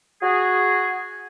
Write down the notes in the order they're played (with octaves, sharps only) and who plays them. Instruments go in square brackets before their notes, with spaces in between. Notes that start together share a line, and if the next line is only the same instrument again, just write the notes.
[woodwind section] F#4 G#4